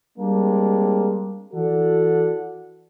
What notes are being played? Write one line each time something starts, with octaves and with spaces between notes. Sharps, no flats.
G3 G#3 A#3 C4 D4
E3 F#4 A4 D5 F#5